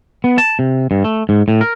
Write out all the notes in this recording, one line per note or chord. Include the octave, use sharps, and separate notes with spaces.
B3
A5
C3
G2
A3
G#2
A2
A#4